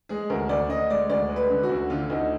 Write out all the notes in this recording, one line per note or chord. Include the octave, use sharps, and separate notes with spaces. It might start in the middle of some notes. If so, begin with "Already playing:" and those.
G#3 G#4
D2 A#4
D2 D5
D2 D#5
G#3 D5
D2 D5
G#3
B4
D3
F#4
D2
D3 F4
D2 D#4